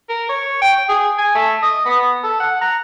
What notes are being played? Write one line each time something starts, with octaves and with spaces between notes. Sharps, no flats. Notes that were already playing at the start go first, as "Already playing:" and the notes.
A#4
C#5
G5
G#4
G#5
A3
D#5
B3
A4
F#5
A#5